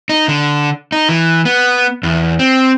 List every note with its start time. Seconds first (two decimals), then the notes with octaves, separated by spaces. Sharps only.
0.09 D#4
0.28 D3
0.92 D#4
1.09 E3
1.45 B3
2.03 E2
2.39 C4